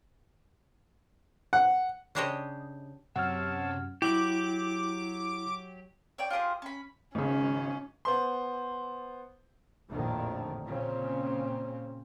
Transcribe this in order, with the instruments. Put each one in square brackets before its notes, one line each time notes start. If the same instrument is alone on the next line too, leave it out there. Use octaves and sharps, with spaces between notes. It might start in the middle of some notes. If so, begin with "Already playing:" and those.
[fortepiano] F#5
[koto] C#3 D4 G4 C5 C#5 D#5
[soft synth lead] F#2 [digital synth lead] C3 [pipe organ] C#5 A5 E6 [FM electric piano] F#5 F6
[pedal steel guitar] F#3 G4 [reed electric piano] E4 [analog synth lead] D6
[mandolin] C#5 D5 G5
F4 G4 G#4 C5
C#4 B5
[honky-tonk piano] G#1 C#3 [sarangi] C#4
[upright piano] B3 C5 C6
[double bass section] A#1 F2 A2 D3 D#3
A#2 C#3 C4 C#4